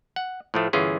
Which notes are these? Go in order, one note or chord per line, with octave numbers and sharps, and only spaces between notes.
F#5
A2 F3 A3
G1 E3 C#4 F4 G#4